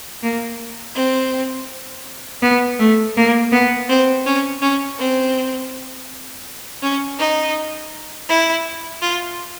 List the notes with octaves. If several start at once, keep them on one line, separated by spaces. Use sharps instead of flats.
A#3
C4
B3
A3
A#3
B3
C4
C#4
C#4
C4
C#4
D#4
E4
F4